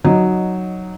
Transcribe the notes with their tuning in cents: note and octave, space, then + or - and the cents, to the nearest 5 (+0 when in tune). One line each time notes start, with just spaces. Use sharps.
F#3 +0 D#4 -10 D#5 +0